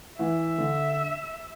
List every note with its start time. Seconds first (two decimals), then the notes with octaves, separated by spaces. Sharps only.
0.19 E3 E5
0.58 D3